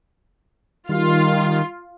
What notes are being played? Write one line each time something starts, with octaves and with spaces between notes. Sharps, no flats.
D#3 G3 F4